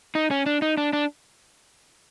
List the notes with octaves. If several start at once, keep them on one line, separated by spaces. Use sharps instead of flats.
D#4
C#4
D4
D#4
D4
D4